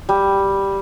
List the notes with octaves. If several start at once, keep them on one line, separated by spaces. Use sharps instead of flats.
G3